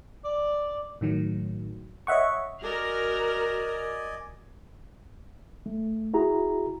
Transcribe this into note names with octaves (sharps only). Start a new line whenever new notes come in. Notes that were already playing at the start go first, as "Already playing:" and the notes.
D5
A2 D#3 F#3
C#5 D#5 E5 F#5 C#6
F#4 A#4 D5 D#5 G#5
A3
E4 F#4 G#4 A#5